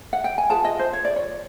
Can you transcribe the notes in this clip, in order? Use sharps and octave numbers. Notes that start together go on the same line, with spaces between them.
F#5
G5
G#5
F4 G#4 B4 A5
D#5
C5
C#5
D5
C#5